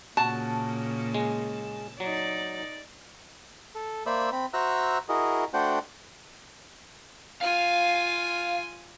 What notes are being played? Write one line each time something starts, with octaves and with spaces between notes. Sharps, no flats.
A#2 C#3 A#3 F#4 A5
G#3
F#3 D#4 D5
A4
A#3 C5 D5 E5 B5 E6
C4 B5
F#4 C5 E5 A#5 E6 F#6
E4 F#4 G#4 A#4 D#5
A3 D4 F#4 C5 F#5 G5
F4 F5 G#5